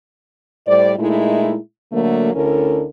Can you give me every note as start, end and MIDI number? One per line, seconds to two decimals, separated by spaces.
0.67 0.94 45
0.67 0.94 55
0.67 0.94 72
0.67 0.94 74
0.98 1.56 46
0.98 1.56 56
0.98 1.56 57
0.98 1.56 63
0.98 1.56 64
1.92 2.32 50
1.92 2.32 54
1.92 2.32 57
1.92 2.32 58
2.34 2.85 38
2.34 2.85 50
2.34 2.85 61
2.34 2.85 64
2.34 2.85 69
2.34 2.85 70